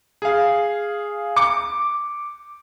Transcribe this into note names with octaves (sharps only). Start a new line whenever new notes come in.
G#4 F5
D6 C#7